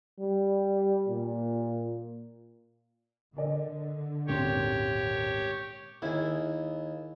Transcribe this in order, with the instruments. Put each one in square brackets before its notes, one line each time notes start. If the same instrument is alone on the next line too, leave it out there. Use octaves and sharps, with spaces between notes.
[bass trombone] G3
A#2
[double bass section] D3 [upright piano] A#4 D5 D#5
[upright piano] D#1 G#1 C6 [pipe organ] G4 C#5
[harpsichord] D#2 [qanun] E4 G#4